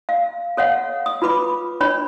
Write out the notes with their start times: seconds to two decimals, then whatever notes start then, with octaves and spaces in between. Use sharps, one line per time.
0.09 F5
0.57 A4 C#5 F5 F#5
1.06 D#6
1.22 F4 B4 B5 D6
1.80 D4 C#5 B5